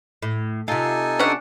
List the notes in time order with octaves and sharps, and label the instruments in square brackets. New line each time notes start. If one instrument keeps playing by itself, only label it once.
[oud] A2
[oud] C3 F4 [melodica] D#4 A4 G#5
[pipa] C#4 D4 F#5